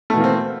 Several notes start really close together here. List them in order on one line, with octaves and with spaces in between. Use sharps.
A3 B2 E3 A#3 C4